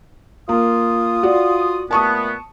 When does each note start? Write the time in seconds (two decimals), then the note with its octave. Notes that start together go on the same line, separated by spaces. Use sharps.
0.49 A#3 F4 D#6
1.23 F#4 D5
1.91 A#2 A3 B3 A5 C#6 D#6